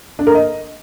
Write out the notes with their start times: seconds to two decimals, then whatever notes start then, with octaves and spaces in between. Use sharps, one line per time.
0.19 D4
0.27 A#4
0.34 D#5